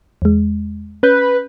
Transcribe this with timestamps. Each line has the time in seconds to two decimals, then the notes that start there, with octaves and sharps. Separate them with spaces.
0.22 E2 G#3
1.03 C#4 B4 F#6 G6